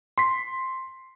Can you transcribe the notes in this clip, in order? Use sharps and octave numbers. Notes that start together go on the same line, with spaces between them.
C6 B6